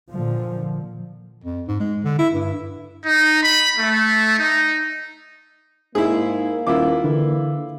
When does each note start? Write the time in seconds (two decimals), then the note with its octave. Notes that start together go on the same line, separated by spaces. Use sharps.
0.11 A#2 D3 F3
1.44 F2
1.68 G#2
1.80 G#3
2.04 D3
2.19 E4
2.34 G2
3.06 D#4
3.44 B5
3.78 A3
4.39 D#4
5.95 G#2 A#3 E4 G#4
6.67 D#1 E4 F4 D6
7.04 D3 E3